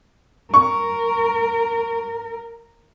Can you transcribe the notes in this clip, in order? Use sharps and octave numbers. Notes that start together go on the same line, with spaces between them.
A#4 C#6